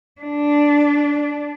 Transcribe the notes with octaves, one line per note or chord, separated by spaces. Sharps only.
D4